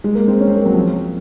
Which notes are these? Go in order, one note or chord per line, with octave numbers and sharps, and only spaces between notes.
G#3
A#3
C4
C#4
C4
A#3
F#3
F3